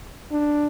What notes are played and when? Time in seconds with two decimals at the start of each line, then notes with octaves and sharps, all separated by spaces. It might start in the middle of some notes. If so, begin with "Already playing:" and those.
0.32 D4